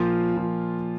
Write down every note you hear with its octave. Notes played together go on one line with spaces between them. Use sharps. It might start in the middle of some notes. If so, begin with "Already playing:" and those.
Already playing: A#2 F3 F4
A#2 F3